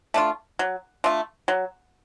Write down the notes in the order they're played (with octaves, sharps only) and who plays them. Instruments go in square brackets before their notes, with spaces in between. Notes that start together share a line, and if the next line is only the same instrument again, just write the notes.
[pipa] A3 D4 F4
F#3
A3 D4 F4
F#3